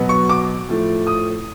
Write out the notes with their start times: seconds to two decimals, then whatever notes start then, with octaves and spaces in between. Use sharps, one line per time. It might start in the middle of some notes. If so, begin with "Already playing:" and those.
Already playing: B2 F#3 B3
0.09 C#6
0.29 D6
0.69 A2 F3 A3
1.07 D#6